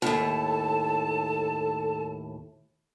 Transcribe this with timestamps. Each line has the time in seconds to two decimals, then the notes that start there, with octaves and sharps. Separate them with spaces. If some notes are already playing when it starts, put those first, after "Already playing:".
0.02 D#2 A2 A4 A5